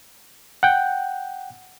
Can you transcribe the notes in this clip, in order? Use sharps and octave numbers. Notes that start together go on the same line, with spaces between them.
F#5 G5